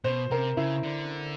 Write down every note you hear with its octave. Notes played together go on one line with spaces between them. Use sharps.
B2 C5
C3 A#4
C#3 E4
D3